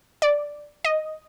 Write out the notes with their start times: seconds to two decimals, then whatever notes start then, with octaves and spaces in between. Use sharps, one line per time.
0.22 D5
0.85 D#5